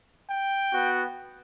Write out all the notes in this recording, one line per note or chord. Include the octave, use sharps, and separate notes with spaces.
G5
B3 F#4